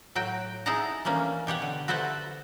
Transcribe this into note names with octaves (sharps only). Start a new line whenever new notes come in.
A2 F#3 F#4 G5
D#4 E4 G#4 F#5 A5 A#5
E3 A3 A#3 C#4 D4
B2 G4 C#5 F#5
D3
F#4 A4 B4 C5 E5 F#5